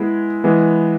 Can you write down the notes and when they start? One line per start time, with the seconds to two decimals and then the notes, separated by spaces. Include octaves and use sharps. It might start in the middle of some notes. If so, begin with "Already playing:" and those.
Already playing: G#3 B3 E4 G#4
0.44 E3 G#3 B3